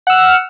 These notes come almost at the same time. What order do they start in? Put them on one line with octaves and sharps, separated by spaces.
F#5 E6 F6